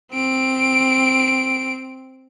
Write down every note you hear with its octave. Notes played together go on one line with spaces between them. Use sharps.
C4 D7